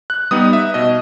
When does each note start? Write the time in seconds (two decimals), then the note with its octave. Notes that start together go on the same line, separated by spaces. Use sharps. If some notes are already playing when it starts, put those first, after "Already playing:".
0.10 F#6
0.31 G3 B3 D#4 D#6
0.53 E5
0.74 B2 D#5